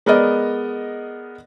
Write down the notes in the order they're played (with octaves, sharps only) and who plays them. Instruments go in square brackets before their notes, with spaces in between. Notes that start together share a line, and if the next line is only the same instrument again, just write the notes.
[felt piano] G#3 B3 A#4 D5 D#5